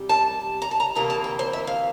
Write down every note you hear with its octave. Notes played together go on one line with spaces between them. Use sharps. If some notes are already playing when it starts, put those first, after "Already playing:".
Already playing: E2 C3 G3
A5
A#5
A5
A#5
D2 C3 E3 A#3 A#5
A5
G5
C5
E5
F5